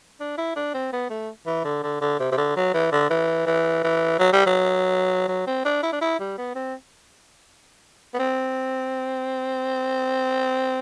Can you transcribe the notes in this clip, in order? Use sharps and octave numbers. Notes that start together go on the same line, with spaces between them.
D4
E4
D4
C4
B3
A3
E3
D3
D3
D3
C3
C3
D3
F#3
E3
D3
E3
E3
E3
F#3
G3
F#3
F#3
C4
D4
E4
D4
E4
G3
B3
C4
B3
C4